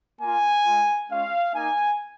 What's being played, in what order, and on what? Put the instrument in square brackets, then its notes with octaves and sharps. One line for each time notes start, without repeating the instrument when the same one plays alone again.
[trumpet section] A#3 F4 G#5
G#3 F4
G#3 C#4 F4 F5
A#3 D#4 G#5